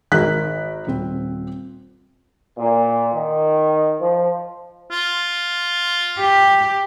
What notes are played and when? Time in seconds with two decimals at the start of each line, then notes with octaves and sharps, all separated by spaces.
0.12 G#1 A#4 F#6 B6
0.87 D#1 C4
2.58 A#2
3.13 D#3
4.01 F3
4.91 F4
6.19 G4